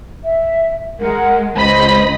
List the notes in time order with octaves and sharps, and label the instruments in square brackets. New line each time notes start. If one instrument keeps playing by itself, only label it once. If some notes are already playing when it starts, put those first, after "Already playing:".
[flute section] E5
[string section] G#3 [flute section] A#4 F#5
[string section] C#2 D#5 B5 [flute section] C5